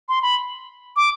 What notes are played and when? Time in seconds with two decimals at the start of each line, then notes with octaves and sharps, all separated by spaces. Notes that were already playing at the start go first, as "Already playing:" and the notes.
0.09 C6
0.22 B5
0.96 D6